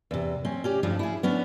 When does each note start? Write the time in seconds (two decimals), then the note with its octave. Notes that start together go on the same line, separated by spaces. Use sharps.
0.11 E2 C3
0.45 C4 C#4
0.64 C#4 G4 D5
0.83 G2 F3 A3 E4
0.99 E4 G#4
1.23 B3 C#4 D4